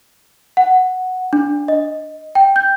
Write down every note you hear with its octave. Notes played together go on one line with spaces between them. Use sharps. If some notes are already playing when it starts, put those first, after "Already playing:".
F#5
D4
D#5
G5
G6